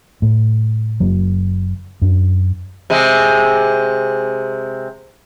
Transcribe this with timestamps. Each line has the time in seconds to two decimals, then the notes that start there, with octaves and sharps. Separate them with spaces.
0.22 A2
1.00 F#1 F#3
2.02 F#2 D4
2.90 C3 G#3